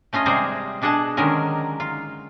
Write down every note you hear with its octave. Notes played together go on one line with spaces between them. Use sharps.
A3 C#4 F4 D#5
C3 G3 G#3 G#4 C5 A#5
B2 D4 G#4 A4 F#5
D3 D#3 F#3 G#3 C#4 A#4
F4